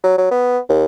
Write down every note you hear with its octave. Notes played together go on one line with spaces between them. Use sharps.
F#3
F#3
B3
D#2